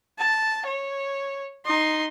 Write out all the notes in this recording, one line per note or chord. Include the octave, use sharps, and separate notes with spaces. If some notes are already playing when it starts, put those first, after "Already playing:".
A5
C#5
D#4 C6